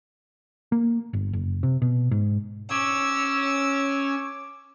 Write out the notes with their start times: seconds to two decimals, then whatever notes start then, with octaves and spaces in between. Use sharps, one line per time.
0.72 A#3
1.13 G1
1.33 F#1
1.63 C3
1.82 B2
2.11 G#2
2.71 C#4 C#5 D6 E6